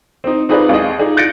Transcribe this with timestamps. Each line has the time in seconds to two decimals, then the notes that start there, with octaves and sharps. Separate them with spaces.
0.24 C4 D#4
0.49 C4 D#4 F4 G#4 B4 D5
0.69 D#2 G#3 D#5
0.99 D#4 F4 G#4 D5
1.17 F#6 G6 A6 A#6 C#7 D7